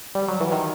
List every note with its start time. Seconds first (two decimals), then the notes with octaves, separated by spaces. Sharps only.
0.15 G3
0.28 F#3
0.40 E3
0.52 D#3